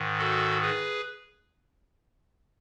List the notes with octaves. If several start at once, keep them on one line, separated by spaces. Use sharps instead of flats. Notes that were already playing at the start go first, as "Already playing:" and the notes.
Already playing: G#2 D#3
F#4 A4
G#4 B4